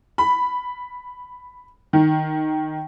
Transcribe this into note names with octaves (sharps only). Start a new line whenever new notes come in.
B5
D#3